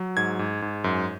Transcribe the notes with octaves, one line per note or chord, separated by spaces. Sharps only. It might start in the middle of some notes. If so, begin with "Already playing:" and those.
Already playing: F#3
G#2 G#6
G#2
G#2
F#2